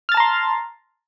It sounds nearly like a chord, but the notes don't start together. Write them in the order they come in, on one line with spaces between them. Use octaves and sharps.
F6 A6 A5 A#5 C6